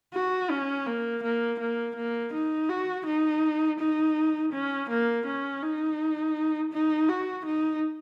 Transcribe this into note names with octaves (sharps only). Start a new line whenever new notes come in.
F#4
C#4
A#3
A#3
A#3
A#3
D#4
F#4
D#4
D#4
C#4
A#3
C#4
D#4
D#4
F#4
D#4